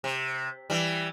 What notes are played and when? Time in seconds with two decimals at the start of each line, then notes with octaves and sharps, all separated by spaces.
0.04 C3
0.70 E3 G3